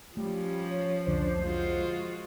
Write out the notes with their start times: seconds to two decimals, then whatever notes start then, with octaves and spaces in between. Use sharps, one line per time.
0.17 F3 G3 A3 C#4
0.70 C#5
1.07 C2 F2 D3 D4 C5
1.42 F3 G#3 F4 F#4